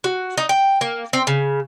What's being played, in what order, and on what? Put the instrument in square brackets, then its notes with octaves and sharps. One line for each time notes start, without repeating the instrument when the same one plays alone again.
[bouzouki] F#4
D#4
G5
A#3
C4
C#3